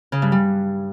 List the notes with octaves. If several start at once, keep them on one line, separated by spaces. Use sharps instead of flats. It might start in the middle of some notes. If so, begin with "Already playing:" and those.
C#3
G2
G3